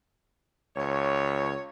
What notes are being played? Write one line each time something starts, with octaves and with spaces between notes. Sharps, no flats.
C#2 C#5